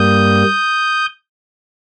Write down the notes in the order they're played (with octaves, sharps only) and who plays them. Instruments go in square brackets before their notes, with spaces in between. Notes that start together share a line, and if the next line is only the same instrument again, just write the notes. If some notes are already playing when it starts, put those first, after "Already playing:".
Already playing: [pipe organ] G2 G3 A#3 D#6 G6